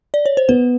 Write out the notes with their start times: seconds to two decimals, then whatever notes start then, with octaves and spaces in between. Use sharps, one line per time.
0.14 D5
0.26 C#5
0.37 C5
0.49 B3 B4